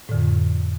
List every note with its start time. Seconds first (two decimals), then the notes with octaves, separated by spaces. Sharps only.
0.09 A2
0.12 D3
0.14 F2